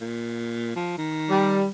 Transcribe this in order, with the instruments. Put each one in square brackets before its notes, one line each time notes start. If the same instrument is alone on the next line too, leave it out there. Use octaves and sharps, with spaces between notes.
[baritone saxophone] A#2
F3
D#3
[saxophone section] G3